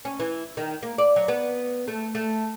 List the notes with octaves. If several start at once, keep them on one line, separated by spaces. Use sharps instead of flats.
C#4
E3
D#3
A#3
D5
F#3
B3
A3
A3